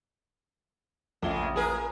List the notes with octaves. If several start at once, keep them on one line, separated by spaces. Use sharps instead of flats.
A#1 C#3 G#3 A3 G7
G#4 A#4 B4